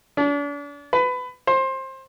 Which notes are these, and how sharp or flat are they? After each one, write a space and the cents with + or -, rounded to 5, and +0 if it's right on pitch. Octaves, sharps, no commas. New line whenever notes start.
D4 -40
B4 +20
C5 +20